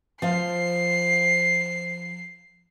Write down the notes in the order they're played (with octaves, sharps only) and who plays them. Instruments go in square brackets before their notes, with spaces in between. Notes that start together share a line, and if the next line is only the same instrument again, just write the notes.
[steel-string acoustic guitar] F3 C5 F5 [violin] C7